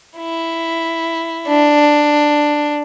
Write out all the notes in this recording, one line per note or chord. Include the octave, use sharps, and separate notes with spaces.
E4
D4